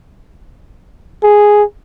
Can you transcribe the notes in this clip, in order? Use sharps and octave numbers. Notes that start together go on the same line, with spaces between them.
G#4